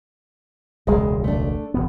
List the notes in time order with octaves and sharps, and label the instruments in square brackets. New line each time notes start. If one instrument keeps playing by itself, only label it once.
[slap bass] E1 C#2 A#2 [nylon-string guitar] G#3
[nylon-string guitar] A3 D4
[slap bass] F1 F2 B3